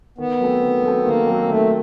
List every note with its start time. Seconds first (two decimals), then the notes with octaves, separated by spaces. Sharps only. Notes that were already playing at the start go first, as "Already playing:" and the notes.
0.18 D#3 B3
0.40 F#3 A3 C4
0.62 D#3
0.83 F#3 A3 C4
1.05 D#3 A#3
1.27 F#3 A3 C4
1.49 D#3 A3